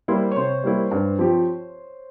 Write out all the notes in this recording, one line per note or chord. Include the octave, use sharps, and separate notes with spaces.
G3 A#3 E4 C5
C3 C5 C#5
G3 A#3 E4
G2
F3 C4 G4